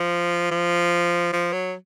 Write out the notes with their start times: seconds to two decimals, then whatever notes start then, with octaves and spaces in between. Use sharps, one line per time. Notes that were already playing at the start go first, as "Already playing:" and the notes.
Already playing: F3
0.51 F3
1.33 F3
1.53 F#3